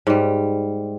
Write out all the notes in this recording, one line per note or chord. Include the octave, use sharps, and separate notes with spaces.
G#2 G3